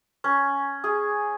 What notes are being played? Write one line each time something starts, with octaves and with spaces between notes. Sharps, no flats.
C#4
G#4